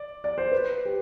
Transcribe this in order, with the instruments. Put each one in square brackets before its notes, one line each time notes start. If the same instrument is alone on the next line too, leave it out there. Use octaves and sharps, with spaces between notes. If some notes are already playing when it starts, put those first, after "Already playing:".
Already playing: [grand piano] D5
D5
C5
B4
G4